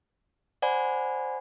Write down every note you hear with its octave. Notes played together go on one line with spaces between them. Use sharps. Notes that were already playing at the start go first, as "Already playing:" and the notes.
C5 D5 F#5 G#5 B5